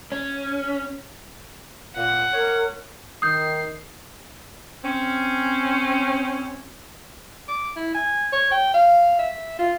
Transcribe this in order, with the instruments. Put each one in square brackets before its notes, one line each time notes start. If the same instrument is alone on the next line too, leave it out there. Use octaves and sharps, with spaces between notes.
[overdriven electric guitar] C#4
[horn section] A#2 [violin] F#5
[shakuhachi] A#4 [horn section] C#5
[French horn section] D#3 [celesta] D#6 G6 [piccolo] C7
[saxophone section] C4 C#4
[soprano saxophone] D6
E4
G#5
C#5
G5
F5
E5
F4